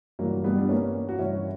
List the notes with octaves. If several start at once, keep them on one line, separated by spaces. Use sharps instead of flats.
G2 E3 F#3 A#3
G3 B3
D4
A#3 C#4
F#4
G2 E3 C#4 E4